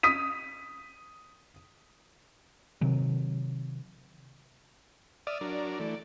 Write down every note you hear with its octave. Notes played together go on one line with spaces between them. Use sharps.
D#6 B6 D#7
C3 D#3 F#3
D5 E5 D#6 F6
F#3 D4 A#4
E3 A3